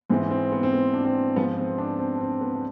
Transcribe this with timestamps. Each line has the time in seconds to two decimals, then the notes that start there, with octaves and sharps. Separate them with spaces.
0.09 G#2 E3 C4
0.31 C4
0.52 B3
0.63 C4
0.73 B3
0.94 D4
1.05 C4
1.36 G#2 F3 B3
1.58 C4
1.78 D4
1.99 C4
2.15 D4
2.21 C4
2.41 B3
2.55 D4